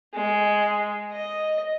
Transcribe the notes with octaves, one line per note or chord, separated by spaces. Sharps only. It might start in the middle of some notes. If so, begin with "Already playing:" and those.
G#3
D#5